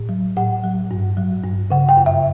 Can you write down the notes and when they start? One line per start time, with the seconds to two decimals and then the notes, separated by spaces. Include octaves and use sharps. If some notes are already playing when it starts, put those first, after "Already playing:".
Already playing: A2
0.09 F#3
0.37 A2 F#5
0.64 F#3
0.91 G2
1.17 F#3
1.44 G2
1.71 C#3 F#5
1.89 G5
1.97 F#2
2.06 E5